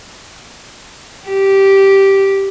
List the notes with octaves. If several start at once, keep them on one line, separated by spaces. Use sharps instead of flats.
G4